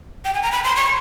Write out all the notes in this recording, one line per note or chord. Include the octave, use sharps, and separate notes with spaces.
G5
G#5
A#5
B5
C6
C#6